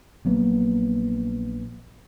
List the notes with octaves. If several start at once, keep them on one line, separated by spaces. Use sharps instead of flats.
A#1 F#3 A#3 B3